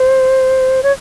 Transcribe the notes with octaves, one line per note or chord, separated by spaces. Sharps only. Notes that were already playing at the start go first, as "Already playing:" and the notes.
Already playing: C5
C#5